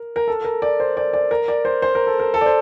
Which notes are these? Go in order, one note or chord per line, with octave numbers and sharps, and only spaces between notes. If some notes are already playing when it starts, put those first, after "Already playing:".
Already playing: A#4
A#4
A4
A#4
D5
C5
D5
D5
A#4
D5
C5
C5
A#4
A4
A#4
A4
D5
C5